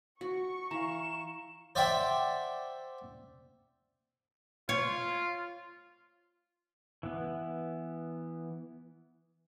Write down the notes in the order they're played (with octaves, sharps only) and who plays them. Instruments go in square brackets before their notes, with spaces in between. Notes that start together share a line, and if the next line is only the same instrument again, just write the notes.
[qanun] F#4 [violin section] C#6
[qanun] E3 [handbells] F5 A#5 [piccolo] E7
[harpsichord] C5 D5 E5 F#5 G5
[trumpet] F4 [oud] C#5
[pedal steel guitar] E3 B3